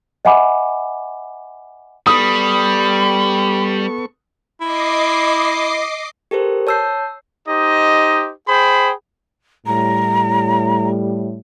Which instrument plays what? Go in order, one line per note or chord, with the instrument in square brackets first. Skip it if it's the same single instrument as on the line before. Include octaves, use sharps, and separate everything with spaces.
[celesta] D#5 E5 F#5 G#5 B5 D6
[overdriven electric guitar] G3 [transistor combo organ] B3 A4 C#6 [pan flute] B5 [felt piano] D#6
[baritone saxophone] E4 [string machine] D#5 D6 C7
[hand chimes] G4 A4 A#4 C5
C#5 A5 E6 G6 C7
[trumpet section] D#4 G4 C5 D#5
G#4 C5 G5 B5
[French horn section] A2 G3 [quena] A#5